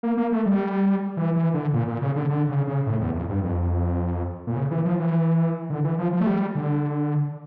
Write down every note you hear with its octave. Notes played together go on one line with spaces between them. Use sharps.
A#3
A#3
A3
G3
E3
E3
D3
A#2
A#2
C#3
D3
D3
C#3
C#3
A2
E2
F2
G2
F2
A#2
C#3
E3
F3
E3
D3
E3
F3
F3
A3
G3
D3